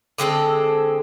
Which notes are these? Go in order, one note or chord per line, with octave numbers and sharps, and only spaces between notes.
D3 G#3 C4 A4